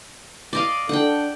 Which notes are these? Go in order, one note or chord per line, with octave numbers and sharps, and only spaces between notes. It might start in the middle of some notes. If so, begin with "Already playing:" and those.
D5 D#5 F5
D4 A4 F#5 G5